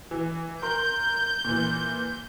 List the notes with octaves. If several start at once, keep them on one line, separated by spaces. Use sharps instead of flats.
E3
A#4 C6 G6
A#2 E3